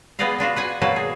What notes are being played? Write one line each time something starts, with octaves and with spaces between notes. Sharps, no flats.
B3 G#4 B4 D5 D#5 F5
B3 D4 F4 F#4
B4 F#5 G#5
B2 F#3 A#3 B4 A5
G#4